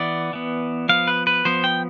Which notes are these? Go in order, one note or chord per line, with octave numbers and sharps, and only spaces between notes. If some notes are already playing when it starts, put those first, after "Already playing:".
Already playing: E3 B3 D5
E3 B3
F3 B3 F5
B4
B4
F3 B3 C5
G5